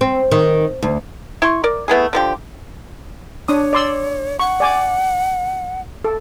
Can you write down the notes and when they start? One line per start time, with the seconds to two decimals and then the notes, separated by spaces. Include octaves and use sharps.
0.01 C4
0.31 D#3
0.83 D2
1.42 E4 C6 C#6
1.64 A#4 D5
1.88 A3 B3 E4 G#4
2.13 D3 F3 G4
3.48 D4 C#5 D#6
3.73 D5 C6 E6
4.39 F#5 C#6
4.60 D5 G#5 D6
6.05 A4